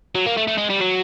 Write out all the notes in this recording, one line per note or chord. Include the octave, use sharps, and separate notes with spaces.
F#3
A#3
A3
A3
G#3
G3
F#3